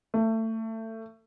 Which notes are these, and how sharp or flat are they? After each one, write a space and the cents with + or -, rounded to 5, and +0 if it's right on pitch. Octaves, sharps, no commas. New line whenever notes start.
A3 +25